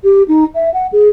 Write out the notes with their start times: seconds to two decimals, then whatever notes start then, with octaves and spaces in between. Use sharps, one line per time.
0.04 G4
0.28 D#4
0.55 E5
0.74 F#5
0.92 G#4